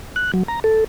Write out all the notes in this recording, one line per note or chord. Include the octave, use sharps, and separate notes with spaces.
F#6
F#3
A#5
A4